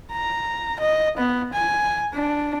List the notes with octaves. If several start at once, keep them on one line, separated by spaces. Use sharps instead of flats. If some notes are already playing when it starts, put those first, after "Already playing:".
A#5
D#5
B3
G#5
D4